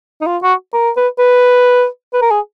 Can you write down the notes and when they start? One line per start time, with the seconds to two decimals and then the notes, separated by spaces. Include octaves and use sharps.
0.21 D#4
0.27 F4
0.43 F#4
0.74 A#4
0.97 B4
1.19 B4
2.13 B4
2.22 A#4
2.31 G#4